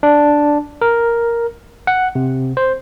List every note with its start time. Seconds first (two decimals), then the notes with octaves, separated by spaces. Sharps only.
0.03 D4
0.82 A#4
1.87 F#5
2.15 C3
2.57 C5